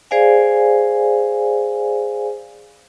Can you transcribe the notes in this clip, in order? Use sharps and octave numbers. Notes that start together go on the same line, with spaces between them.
G#4 C5 D5 F5 G#5